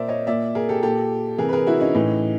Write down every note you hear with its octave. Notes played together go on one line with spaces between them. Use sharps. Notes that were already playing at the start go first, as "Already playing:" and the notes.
Already playing: A#2 A#4 C5 D5 E5
C#5 D#5
A#2 D5 E5
G#4 A#4
G4 A4
A#2 G4 A4
C3 E3 G#4 A#4
B4
G#4 A#4
E4 F#4
C#4 D#4
A2 E3